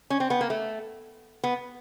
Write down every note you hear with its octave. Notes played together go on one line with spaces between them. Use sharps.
C#4
C4
B3
A#3
A3
B3